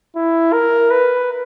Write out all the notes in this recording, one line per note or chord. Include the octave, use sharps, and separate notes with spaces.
E4
A#4
B4